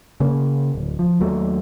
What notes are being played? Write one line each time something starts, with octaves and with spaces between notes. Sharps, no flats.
C#3 A#3
D1
F3
D#2 F#3 A3